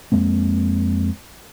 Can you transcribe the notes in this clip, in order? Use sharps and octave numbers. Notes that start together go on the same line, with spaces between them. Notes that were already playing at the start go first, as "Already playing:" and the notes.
F2 G#3 A#3 C4